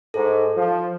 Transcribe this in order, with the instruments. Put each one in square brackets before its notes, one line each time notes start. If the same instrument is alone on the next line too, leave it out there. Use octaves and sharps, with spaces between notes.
[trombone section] G#2 [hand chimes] A4
[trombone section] F3